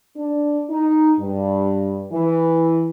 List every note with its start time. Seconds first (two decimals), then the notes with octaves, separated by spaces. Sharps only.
0.16 D4
0.69 D#4
1.18 G2
2.13 E3